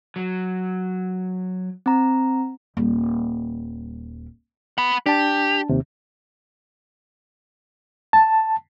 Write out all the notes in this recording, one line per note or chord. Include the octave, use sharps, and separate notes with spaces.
F#3
C4 A#5
D#1 G3
F#5 B5
D4 G4 A5
D#2 C3
A5